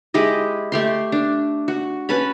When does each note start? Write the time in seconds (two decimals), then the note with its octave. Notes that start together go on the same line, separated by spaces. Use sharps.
0.14 G#3 E4 G4 D#5
0.72 A3 G4 C6
1.12 D4
1.68 F#4
2.09 C#4 B4 A5 B5